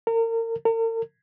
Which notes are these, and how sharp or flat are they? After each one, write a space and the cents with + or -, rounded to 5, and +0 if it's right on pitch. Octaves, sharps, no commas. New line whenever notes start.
A#4 -35
A#4 -45